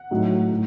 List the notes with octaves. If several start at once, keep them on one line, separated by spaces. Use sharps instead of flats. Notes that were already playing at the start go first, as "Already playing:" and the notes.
Already playing: F#5
A2 F#3 A3 D#4
A2